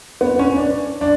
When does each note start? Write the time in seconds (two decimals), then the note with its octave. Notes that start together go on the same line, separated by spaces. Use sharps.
0.21 B3
0.39 C#4
0.57 D4
1.01 D4